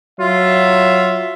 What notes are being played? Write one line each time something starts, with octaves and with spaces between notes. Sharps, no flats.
F#3 F4 E5